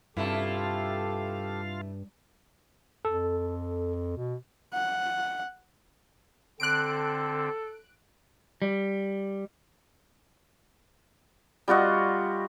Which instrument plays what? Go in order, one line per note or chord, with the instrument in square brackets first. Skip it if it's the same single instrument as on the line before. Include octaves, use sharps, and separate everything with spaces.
[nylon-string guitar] G2 [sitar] C3 A3 E4 [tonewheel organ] F4 F5 [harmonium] G4 A4
[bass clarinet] F2 [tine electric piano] A4
[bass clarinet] B2
[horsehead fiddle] F#5
[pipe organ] D3 C4 [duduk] A4 [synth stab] F#6 D7
[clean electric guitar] G3
[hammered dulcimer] G3 F4 F#4 D#5